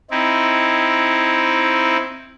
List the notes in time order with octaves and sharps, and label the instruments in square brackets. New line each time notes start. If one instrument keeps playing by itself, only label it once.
[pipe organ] C4 D#4 E4